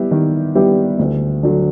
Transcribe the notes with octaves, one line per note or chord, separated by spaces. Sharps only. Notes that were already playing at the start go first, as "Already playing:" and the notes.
Already playing: G3 B3 E4 G4
D#3
G3 B3 E4 G4
D2
D3 F#3